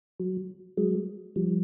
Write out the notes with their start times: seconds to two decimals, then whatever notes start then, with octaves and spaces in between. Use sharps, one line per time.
0.20 F#3
0.77 F#3 G#3
1.36 F3 G3